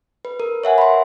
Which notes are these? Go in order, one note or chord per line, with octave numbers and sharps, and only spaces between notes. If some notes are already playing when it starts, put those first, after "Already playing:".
B4
A#4
C#5 E5 F#5 G#5
B5 C6